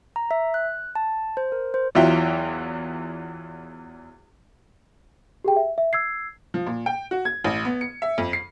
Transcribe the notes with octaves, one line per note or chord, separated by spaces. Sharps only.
A#5
E5
F#6
A5
C5
A#4
C5
E2 E3 F#3 F4 E5 G5
G4 G#4 G5
E5
E5
E6 G#6 C7
F3
A#2
G5
F#4
G#6
A1
B3
C#7
E5
F2
C7